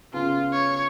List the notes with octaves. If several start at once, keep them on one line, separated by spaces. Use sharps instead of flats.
C#3 B3 F4
C#5